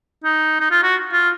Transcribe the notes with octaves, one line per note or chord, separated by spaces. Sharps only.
D#4
D#4
F4
F#4
F4